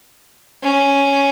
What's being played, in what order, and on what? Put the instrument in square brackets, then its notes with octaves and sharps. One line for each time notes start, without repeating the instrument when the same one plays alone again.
[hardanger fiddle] C#4